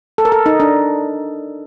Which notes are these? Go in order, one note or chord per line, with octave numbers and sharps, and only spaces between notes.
A4
A#4
A4
D#4
D4